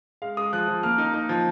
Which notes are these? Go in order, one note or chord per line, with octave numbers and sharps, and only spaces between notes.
G#3 F5
G#3 D#6
F3 F#6
F3
A#3 F6
D#4
D#4
F3